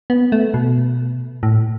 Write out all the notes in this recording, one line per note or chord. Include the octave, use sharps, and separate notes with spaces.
B3
A3
B2
A2